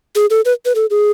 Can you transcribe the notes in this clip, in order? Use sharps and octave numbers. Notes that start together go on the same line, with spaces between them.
G#4
A4
B4
B4
A4
G#4